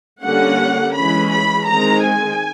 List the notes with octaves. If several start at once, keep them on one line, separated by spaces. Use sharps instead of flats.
D3 G3 A#3 C#4 F#5
E3 G#3 C#4 B5
B5
D#3 G#3 C4 A#5
G#5